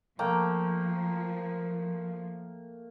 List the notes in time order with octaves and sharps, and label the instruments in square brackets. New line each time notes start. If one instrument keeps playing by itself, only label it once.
[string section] F3 [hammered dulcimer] A3 A#3 G5